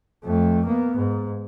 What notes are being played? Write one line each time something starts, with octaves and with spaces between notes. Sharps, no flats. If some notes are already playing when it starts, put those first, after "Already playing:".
F2 A3
A#3 B3
G#2